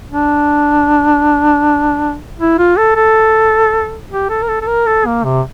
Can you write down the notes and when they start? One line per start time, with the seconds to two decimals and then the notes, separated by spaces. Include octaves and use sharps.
0.11 D4
2.39 E4
2.59 F4
2.78 A4
2.96 A4
4.11 G4
4.30 A4
4.43 A#4
4.49 A4
4.62 A4
4.68 A#4
4.87 A4
5.06 A#3
5.24 C3